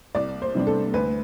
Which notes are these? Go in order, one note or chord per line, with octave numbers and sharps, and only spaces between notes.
C2 D5
C5
C3 G3 B3 D4
A4
D2 B4